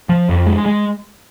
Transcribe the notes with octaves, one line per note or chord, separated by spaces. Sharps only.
F3
F2
G#3
G#3